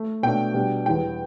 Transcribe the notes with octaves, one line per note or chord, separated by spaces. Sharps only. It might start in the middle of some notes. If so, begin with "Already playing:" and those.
Already playing: A3
B2 A3 D4 G5
B2 G3 D4
E2 E3 G3 G5